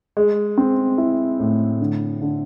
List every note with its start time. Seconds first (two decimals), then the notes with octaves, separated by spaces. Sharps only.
0.17 G#3
0.58 C4
0.98 E4
1.40 A2
1.81 D3
2.22 D3